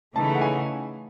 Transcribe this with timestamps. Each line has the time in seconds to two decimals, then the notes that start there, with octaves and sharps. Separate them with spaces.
0.15 C#3 E3 A3 D#4 A5
0.34 F#5
0.41 G#5